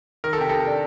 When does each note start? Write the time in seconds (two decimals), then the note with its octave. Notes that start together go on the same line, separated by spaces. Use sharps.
0.24 D#3 A#4
0.33 A4
0.38 C3 G4
0.49 C3 A4
0.67 D4